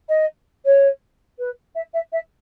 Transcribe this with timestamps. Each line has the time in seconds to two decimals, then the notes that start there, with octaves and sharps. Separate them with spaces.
0.09 D#5
0.65 C#5
1.38 B4
1.75 E5
1.93 E5
2.12 E5